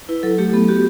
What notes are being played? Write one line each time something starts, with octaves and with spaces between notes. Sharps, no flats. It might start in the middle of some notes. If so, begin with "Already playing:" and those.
E4 B4
F#3 A4
A3 G4
B3 A4
F#4 G4